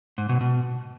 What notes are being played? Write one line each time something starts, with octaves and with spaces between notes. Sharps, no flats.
G#2
B2
B2